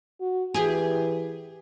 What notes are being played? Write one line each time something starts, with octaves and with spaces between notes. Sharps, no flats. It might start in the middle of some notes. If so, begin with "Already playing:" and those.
F#4
E3 G4 G#4